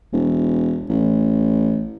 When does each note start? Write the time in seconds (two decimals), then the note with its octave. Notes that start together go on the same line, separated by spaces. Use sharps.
0.13 E1
0.90 A1